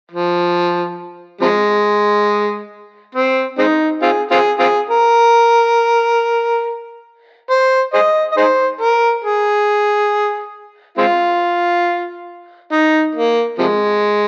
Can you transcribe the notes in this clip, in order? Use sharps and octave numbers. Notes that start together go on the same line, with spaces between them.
F3
C3 F3 G#3
C4
G#3 C4 D#4
C4 F4 G#4
C4 F4 G#4
C4 F4 G#4
A#4
C5
G#4 C5 D#5
D#5
D#4 G#4 C5
A#4
G#4
G#3 C4 F4
D#4
A#3
C3 F3 G#3